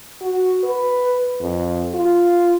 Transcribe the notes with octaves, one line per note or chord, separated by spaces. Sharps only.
F#4
B4
F2
F4